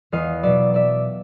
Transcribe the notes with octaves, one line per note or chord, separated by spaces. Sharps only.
E2 D#5 F5
B2 F#3 D5 E5
D5 E5